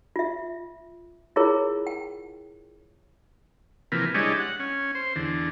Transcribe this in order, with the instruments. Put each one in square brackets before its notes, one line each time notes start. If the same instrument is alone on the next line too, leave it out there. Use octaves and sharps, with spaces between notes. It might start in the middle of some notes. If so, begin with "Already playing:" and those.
[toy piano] F4 E5
E4 F4 G#4 A#4 C#5
G5
[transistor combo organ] C3 E3 F3 A#3 B4
G3 G#3 D4 E4 C#5 D#5
F#5
C#4
C5
E2 D3